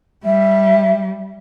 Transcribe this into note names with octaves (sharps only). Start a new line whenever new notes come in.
G3 E5